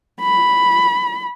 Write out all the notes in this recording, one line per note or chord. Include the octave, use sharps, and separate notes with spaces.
B5